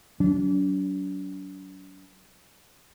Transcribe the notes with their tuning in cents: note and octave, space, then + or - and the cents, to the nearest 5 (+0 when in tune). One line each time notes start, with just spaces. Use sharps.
F#3 +25 D4 -45